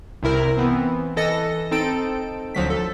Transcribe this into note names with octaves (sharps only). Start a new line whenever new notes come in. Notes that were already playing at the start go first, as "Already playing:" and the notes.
C2 C3 E4 A#4
E3 B3 C4
E3 A4 D#5 A#6 C#7
C4 D#4 A4 D7
D2 F3 F#3 B6
A4